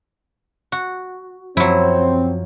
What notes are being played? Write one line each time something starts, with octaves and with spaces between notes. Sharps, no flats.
F#4
F#2 F3 F#3 C4 E4